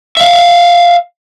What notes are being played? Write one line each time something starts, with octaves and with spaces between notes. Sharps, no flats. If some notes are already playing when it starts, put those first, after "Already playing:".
E5 F5